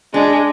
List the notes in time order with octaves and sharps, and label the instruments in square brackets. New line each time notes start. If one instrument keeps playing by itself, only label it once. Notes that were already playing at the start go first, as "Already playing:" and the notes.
[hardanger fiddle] G#3 [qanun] D4